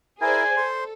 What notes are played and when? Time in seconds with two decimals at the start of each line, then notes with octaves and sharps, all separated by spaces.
0.21 E4 G#4 A#4 C5 D5 G#5
0.57 A4 C5 C6